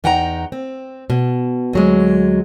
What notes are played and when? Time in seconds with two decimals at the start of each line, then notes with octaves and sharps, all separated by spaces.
0.04 E2 D#4 F#5 G5 A5 A#5
0.52 C4
1.10 B2
1.73 D2 F#3 G#3